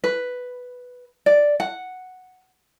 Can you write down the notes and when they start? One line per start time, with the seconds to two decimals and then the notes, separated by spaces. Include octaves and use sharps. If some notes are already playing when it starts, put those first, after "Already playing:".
0.04 B4
1.26 D5
1.60 F#5